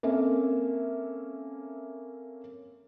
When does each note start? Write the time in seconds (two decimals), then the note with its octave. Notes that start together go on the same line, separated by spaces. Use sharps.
0.03 A#3 C4 C#4 A4 E5